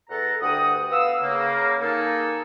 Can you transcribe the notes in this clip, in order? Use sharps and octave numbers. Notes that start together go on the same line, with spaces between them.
E2 A4 F#5 A#5
D2 G2 F#5 G5 D#6
B3 F5 E6
C#3 A#3
A#3 D#4 G#4 A4